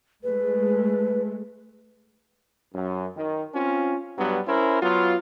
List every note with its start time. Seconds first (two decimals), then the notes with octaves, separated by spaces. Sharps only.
0.23 G#3 A3 B4
2.74 F#2
3.17 D#3
3.55 C4 C#4 F4
4.18 G2 F#3 G3 B3
4.47 C#4 E4 A#4 C5
4.82 F#3 B3 F4